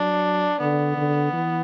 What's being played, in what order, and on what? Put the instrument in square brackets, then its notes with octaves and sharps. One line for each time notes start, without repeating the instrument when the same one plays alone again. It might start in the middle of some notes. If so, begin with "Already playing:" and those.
Already playing: [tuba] F#3 [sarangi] D4
[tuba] D3 [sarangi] B3
[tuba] D3
E3